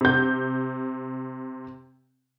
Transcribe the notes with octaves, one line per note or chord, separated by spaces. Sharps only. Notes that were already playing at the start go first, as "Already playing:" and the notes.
C3 G6